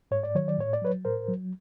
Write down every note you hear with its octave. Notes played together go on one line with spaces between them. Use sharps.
G#2 C#5
D5
D#3 F#3 C#5
D5
A2 C#5
D5
F#3 B4 C#5
A2 A#4 C5
F#3